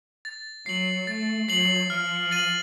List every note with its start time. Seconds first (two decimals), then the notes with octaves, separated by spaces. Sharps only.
0.25 A6
0.66 F#3 C7 F#7
1.07 A3 A6
1.49 F#3 C7 F#7
1.90 F3 F6
2.31 A6 D#7 F#7